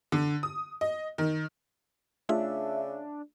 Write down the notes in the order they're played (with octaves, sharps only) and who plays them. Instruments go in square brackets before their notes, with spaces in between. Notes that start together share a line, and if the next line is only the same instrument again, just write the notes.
[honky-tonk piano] D3
D#6
D#5
D#3
[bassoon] C#3 [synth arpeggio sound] A3 F4 G#4 [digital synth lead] D4 [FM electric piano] E5